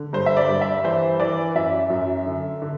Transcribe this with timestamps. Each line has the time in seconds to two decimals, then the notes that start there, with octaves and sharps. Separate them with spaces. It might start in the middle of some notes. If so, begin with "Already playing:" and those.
Already playing: D3
0.13 G2 C5
0.26 E5
0.37 D5
0.49 G2
0.61 E5
0.84 E3 C5
1.20 E3 D5
1.55 F#2 E5
1.90 F#2
2.26 D3
2.62 D3